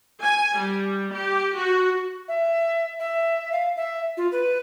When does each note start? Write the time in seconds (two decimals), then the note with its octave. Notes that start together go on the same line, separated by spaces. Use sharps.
0.21 G#5
0.57 G3
1.14 G4
1.57 F#4
2.28 E5
3.00 E5
3.52 F5
3.77 E5
4.17 F4
4.32 B4